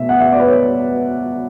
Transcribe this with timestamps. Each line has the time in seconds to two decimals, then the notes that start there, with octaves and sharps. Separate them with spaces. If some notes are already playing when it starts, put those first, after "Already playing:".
Already playing: B2 A3 E5
0.09 F#5
0.20 E5
0.32 D5
0.40 B4
0.47 C#5